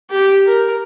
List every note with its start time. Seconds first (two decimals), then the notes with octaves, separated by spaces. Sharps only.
0.11 G4
0.47 A#4